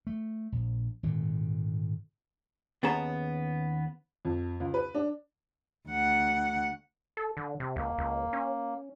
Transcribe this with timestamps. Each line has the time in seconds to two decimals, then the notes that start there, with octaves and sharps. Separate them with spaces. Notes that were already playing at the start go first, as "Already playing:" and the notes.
0.07 A3
0.52 A#1
1.03 G#1 A#2 D3
2.83 D#2 B3 C#4 G#4 A5 A#5
4.25 F2
4.60 C#2
4.74 B4
4.95 D4
5.89 D2 F#5
7.17 A4
7.37 D3
7.60 C3
7.76 C#2 A#3
7.98 C#2
8.33 C#4